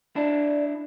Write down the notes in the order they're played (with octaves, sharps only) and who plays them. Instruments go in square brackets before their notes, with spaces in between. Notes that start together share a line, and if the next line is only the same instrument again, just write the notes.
[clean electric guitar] D4 E4 [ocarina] D5